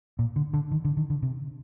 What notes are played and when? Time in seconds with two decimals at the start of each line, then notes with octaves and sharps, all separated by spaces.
0.19 A#2
0.36 D3
0.54 D3
0.71 D#3
0.85 D3
0.97 D#3
1.10 D3
1.22 C3